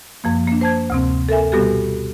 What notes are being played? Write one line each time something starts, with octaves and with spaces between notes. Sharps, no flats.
F#2 F3 A#3
A#3 D4
C5 A5 G#6
D2 C3 C4
A4 A#4 E5 G#5
B2 G3 B3 F#4 G4 A4